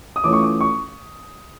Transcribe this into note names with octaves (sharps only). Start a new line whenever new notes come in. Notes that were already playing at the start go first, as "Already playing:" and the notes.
D#6
E3 A3 C#4 F4 D6
C#6
D6
C#6